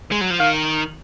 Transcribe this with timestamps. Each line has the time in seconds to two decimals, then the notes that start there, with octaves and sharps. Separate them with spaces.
0.12 G#3
0.21 F#3
0.30 F3
0.39 D#3 F5